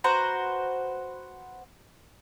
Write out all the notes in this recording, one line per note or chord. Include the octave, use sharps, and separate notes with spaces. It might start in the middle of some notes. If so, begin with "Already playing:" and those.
F#4 B4 C5 A#5